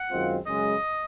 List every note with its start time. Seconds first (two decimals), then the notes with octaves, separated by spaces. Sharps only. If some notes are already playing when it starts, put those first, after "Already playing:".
Already playing: F#5
0.10 F#2 D#3 G#3 C4 F4
0.45 F#2 C#3 G#3 D#5